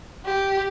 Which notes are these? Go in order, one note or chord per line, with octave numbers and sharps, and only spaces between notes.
G4